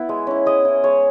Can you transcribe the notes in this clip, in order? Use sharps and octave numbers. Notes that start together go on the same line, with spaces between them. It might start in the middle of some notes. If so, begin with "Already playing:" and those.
Already playing: B3 E4
G#3
C#4 E4
G#3 D#5
C#4 E4
G#3 C#5